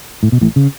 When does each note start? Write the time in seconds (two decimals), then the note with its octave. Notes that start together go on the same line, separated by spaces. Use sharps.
0.23 A2
0.32 B2
0.41 A1 A2
0.56 C#3